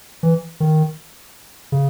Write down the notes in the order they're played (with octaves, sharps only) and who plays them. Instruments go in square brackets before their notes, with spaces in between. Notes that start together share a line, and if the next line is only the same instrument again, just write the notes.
[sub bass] E3
D#3
C#3